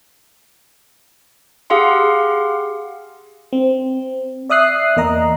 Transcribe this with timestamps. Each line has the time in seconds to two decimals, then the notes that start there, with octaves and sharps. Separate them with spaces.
1.70 G4 G#4 F5 F#5 C6
3.53 C4
4.50 D5 E5 D#6 F#6 C7
4.96 E2 A#3 D#5 A#5